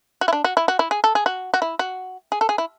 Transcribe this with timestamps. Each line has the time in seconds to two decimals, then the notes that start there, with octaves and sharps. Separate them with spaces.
0.21 F#4
0.28 E4
0.33 D4
0.44 F#4
0.57 E4
0.68 F#4
0.79 E4
0.91 G#4
1.04 A4
1.15 G#4
1.26 F#4
1.54 F#4
1.62 E4
1.79 F#4
2.32 G#4
2.41 A4
2.49 G#4
2.58 E4